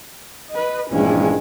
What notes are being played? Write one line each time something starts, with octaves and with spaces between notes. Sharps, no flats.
B4 D#5
A#1 G2 E3 G#3 C#4